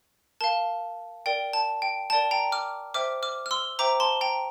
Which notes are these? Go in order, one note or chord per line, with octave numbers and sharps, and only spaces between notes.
A#4 F5 A5
A#4 D5 G5
A5
G5
A#4 D5 G5 A5
G5 A#5
D6 F6
C5 E5 G5 D6 F6
D6 F6
F6
C6 E6
C5 E5 G5 A#5 D6
A5 C6
G5 A#5